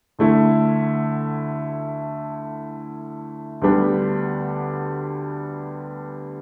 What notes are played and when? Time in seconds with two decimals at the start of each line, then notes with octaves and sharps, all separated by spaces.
0.19 D2 D3 A3 E4
3.62 D2 D3 G3 B3 D4